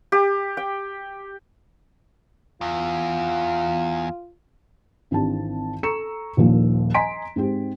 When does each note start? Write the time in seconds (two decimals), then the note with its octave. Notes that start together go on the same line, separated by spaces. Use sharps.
0.12 G4
0.57 G5
2.61 E2 F4
5.11 G#1 E3 C4 D4 G4 A5
5.83 A4 A#5 C#6 E6 C#7 E7
6.37 D#1 A#1 D#2 A#2 F3
6.94 D#5 G#5 A#5 C6 B6 D7
7.36 G#2 G#3 C4 G4